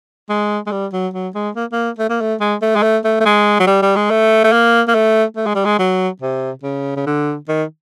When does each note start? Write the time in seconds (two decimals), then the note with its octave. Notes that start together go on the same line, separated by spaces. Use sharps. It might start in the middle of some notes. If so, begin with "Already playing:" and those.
0.29 G#3
0.67 G#3
0.72 G3
0.93 F#3
1.14 F#3
1.35 G#3
1.56 A#3
1.72 A#3
1.99 A3
2.09 A#3
2.21 A3
2.41 G#3
2.62 A3
2.76 G#3
2.83 A3
3.05 A3
3.21 A3
3.26 G#3
3.60 F#3
3.67 G3
3.82 G3
3.96 G#3
4.10 A3
4.44 A3
4.52 A#3
4.88 A#3
4.95 A3
5.36 A3
5.46 G#3
5.55 G3
5.65 G#3
5.79 F#3
6.22 C3
6.63 C#3
6.97 C#3
7.07 D3
7.48 D#3